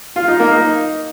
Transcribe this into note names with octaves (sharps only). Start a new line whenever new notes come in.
F4
D#4
A#3
D#4